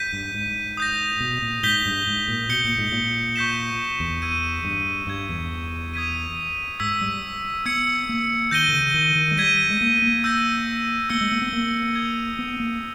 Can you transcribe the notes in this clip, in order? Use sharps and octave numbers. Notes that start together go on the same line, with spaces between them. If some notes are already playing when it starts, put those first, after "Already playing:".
Already playing: G6 B6 D#7
G2
G#2
D#6 G6 A#6
B2
A#2
G#2 G6 B6 G7
G2
G#2
A#2
B2 G6 C#7 G7
A#2
G#2
A#2
C#6 G6 B6 E7
E2
E6 G#6 D#7
G2
G2 G#6 D#7 G7
E2
D#6 G#6 B6 D#7
G#2 E6 G#6 B6
G3
B3 E6 G#6 C#7
A#3
D#3 G6 A#6 D#7 G7
D#3
C#3
D#3
D#3
G#3
G3 G#6 B6 D#7
G#3
A#3
A#3
E6 G6 A#6 D#7
A#3 E6 G#6 C#7 G7
G#3
A#3
B3
A#3
D#6 G#6 D#7 G7
B3
A#3